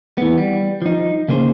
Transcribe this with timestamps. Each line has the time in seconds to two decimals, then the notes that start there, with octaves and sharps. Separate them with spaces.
0.18 E3 B3
0.37 G3
0.82 F3 D#4
1.28 C#3 A#3 G#4 C5